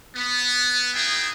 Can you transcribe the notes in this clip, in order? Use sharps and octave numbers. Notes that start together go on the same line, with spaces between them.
B3
B3 D#4 E4 G#4 E5 G5